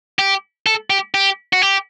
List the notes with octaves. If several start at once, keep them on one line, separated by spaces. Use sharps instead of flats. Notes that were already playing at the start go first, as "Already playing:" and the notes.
G4
A4
G4
G4
F#4
G4